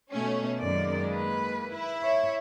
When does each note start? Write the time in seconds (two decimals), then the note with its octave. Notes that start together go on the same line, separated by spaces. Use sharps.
0.12 B2 A3 C#4
0.58 F#2 D#3 G#3 A#3 D5
1.12 B4
1.69 E4
2.00 C#5 E5